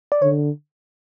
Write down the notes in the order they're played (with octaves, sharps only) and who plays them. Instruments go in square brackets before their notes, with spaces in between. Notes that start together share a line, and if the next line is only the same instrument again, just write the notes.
[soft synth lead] D5
[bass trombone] D3 [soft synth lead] C#5